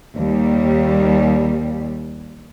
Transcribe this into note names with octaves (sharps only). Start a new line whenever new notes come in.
D#2 G3